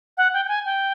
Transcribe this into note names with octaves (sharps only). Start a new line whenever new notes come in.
F#5
G5
G5
G#5
G5